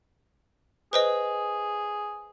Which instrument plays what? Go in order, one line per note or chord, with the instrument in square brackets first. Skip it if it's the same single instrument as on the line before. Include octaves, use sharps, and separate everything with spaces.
[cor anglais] G#4 [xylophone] B4 C5 D#5